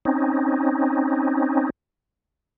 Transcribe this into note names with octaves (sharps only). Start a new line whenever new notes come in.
C4 C#4 D#4